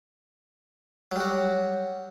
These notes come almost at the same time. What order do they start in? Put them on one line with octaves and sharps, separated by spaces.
F#3 G3 F#4